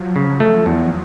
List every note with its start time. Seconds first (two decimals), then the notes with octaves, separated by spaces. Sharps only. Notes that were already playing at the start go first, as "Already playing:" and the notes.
Already playing: F3 F#3
0.16 C#3
0.40 A3
0.66 E2